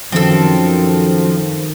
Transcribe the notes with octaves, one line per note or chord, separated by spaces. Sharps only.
F#2 D#3 F3 C4 A4